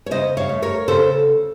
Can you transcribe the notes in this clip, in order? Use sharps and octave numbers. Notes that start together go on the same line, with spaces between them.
C#5
C#3 C5 D#5
C#5 F5
A3
A#4 C#5
C#3 A4 C5